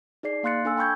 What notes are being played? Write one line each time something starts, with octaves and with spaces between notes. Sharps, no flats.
D#4 G#4 D5 C7
A#3 F5 C6 F#6 A6 C#7
D4 A4 G#5 E6
G5 B5 C#6 G6 G#6